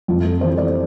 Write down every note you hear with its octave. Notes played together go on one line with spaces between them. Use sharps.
F2 F4
A4
E3 G3 C5
D5